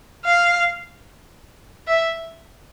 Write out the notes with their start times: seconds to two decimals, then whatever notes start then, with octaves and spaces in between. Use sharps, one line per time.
0.25 F5
1.88 E5